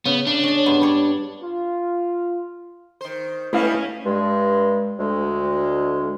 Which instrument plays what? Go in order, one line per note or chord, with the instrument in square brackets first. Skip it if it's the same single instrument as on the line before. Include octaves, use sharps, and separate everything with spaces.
[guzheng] C#3 [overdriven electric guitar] B3
[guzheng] C#3 [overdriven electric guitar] D4
[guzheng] C#4 D#5 A5
G2 G#3 B3
G3 C#5 D5
[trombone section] F4
[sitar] D#3 C5
[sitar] A2 G3 [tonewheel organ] A3 B4 [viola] C#4 D#5 [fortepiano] E4 F5
[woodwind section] G2 G#3
D2 G#3